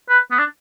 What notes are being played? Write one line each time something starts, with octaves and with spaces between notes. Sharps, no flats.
B4
B3
D4